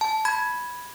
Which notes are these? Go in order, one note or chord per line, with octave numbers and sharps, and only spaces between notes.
A5
B5 G#6